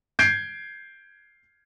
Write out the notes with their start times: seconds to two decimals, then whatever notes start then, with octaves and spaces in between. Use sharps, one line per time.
0.19 G6 G#6 C7 D7